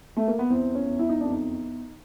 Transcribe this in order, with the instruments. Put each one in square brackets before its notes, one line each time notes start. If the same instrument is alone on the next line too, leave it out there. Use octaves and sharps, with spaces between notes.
[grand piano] A3
A#3
B3
E2 C4
C#4
E2
E4
D#4
F2 D4
D#4